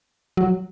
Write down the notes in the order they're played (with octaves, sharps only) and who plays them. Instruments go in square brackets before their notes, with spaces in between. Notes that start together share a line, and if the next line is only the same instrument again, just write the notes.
[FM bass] F#3